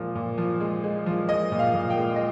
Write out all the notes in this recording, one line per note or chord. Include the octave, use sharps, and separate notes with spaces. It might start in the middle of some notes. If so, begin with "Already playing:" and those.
Already playing: A#2 F3 G#3
A#2
F3
G#3
G#3
F3
G#3 D#5
A#2
F5
A#2
G5
G#3
D#5